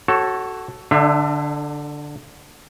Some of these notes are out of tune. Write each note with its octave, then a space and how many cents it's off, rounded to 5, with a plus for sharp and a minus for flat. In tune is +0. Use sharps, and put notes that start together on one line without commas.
F#4 +20 A4 +0 C#5 -25
D3 +0 D4 +45 E5 +30